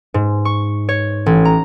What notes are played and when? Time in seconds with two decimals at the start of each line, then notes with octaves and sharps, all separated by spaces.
0.14 G#2
0.45 C#6
0.89 C#5
1.26 A1
1.45 A#5